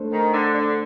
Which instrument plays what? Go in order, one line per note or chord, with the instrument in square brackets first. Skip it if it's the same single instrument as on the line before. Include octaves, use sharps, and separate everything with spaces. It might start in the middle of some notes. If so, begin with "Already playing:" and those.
Already playing: [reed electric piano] A3 D4 A4 C5
[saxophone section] D#3
D3
D3